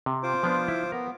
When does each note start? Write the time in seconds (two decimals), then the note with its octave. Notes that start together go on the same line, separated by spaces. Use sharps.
0.06 C3
0.23 F4 C5 D6
0.43 F3 B3 D4
0.68 E4
0.92 B3 A#4